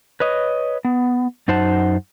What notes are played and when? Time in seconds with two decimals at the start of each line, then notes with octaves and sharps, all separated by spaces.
0.20 B4 C#5 D#5
0.85 B3
1.48 F#2 D#4 C5 F#5 A5